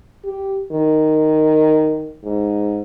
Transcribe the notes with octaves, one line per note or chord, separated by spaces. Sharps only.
G4
D#3
G#2